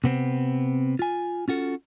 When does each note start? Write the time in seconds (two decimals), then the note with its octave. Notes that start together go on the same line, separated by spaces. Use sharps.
0.04 C3 B3 C4
0.99 F4 G#5
1.48 C#4 F4 F#4 A4